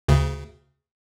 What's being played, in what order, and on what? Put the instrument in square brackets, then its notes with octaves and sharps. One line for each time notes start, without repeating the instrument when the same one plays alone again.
[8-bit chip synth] D2 C#3